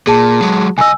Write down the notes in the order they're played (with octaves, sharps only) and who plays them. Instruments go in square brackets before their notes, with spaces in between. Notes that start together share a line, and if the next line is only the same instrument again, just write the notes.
[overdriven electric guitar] A#2 [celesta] G#4 A5
[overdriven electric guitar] F#3 G#3
[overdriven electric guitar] C2 D#5 [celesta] G#5 E6